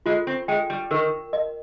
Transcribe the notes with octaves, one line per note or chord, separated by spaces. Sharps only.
G#3 F4
C4
G#3 G5
G3
D#3 A#4
D#5